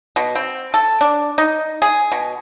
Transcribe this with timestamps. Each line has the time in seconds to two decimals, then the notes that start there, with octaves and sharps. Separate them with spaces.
0.16 B2
0.35 C4
0.74 A4
1.01 D4
1.38 D#4
1.82 G#4
2.12 B2